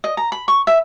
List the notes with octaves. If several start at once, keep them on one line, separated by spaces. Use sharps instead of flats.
D#5
A#5
B5
C#6
E5